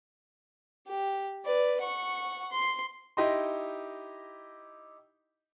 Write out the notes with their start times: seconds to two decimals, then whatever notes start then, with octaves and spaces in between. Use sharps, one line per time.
0.88 G4
1.45 B4 D5
1.81 F#5 C#6
2.51 C6
3.17 D#4 E4 G4 D#5 C6